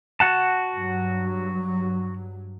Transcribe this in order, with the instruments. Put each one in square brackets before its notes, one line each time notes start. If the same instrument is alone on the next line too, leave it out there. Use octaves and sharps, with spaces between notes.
[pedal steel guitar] F#4 F#5 A5
[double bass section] G2 F#3